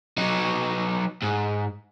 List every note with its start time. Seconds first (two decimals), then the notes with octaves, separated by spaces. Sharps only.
0.18 F#3 D#4
1.22 G#2